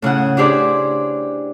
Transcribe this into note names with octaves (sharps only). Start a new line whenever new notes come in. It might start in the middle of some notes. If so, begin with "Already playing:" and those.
A2 C#3 E4 F#5
D4 E4 G4 G#4 C5 D5